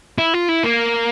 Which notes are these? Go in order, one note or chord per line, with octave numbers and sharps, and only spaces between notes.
E4
F4
E4
A#3